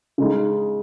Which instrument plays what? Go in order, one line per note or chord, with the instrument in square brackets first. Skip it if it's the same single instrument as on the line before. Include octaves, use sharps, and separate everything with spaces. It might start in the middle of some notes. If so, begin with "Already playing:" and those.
[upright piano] C#3 G#3 D#4